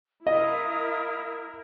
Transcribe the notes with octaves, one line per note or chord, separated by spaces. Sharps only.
E4 F4 A#4 D#5 E5 D#6